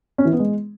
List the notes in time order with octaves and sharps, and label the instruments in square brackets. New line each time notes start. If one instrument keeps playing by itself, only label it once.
[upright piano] C#4
E3
B3
G#3